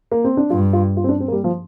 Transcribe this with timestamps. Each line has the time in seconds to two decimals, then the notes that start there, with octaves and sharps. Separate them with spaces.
0.12 A#3
0.24 C4
0.37 D4
0.50 G2 F4
0.73 F4
0.97 F4
1.04 C4
1.09 D4
1.20 C4
1.28 A#3
1.32 G3
1.44 F3